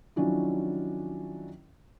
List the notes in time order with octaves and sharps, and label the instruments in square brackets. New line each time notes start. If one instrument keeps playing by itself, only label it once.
[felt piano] D#3 F3 F#3 C#4 D4 E4